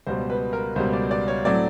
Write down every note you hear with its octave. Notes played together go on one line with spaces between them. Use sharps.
C#2 B2 G3 C5
B4
A#4
C#2 B2 G3 C5
D5
D5
C#5
A2 F#3 A3 C4 D5